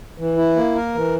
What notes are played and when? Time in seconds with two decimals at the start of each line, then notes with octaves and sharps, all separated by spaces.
0.18 E3
0.37 E4
0.56 A#3
0.75 A#4
0.95 E3